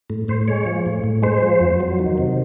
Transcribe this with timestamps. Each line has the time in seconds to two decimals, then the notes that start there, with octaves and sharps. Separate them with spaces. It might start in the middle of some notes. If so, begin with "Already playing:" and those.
0.10 A2
0.28 A2 C5
0.48 G#3 C#5
0.66 F3
0.86 A2
1.04 A2
1.23 G#3 C5
1.42 F3
1.60 F2
1.80 F#3
1.99 D#3
2.18 C3